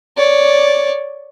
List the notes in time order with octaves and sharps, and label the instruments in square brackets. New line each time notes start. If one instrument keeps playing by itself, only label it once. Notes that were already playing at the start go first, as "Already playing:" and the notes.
[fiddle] C#5 D5